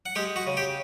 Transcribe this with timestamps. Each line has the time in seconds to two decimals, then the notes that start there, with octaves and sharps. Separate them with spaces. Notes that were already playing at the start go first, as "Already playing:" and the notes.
0.06 F#5
0.15 G#3 G4 G5
0.36 F#4 F#5
0.47 C#3
0.57 G4 G5